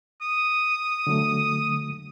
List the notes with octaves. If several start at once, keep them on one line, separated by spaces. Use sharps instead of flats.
D#6
D3 F#3 A3